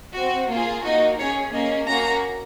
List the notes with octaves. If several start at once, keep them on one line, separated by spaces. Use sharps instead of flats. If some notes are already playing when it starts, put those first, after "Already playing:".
C4 F#4
A#3 F4 G#4
A#3 D#4 F#4 D#5
C#4 G#4 C#5
A#3 C#4 G#4 D#5
A#3 C#4 F#4 A#5